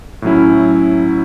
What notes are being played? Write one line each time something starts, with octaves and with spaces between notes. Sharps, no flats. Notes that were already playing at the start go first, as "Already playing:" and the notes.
A2 F#3 C#4 E4